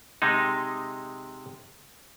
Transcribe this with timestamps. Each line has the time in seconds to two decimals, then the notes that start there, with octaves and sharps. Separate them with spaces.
0.22 C3 G#3 D#4